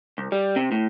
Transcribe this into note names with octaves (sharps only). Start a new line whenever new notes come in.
C2
G3
C3
A2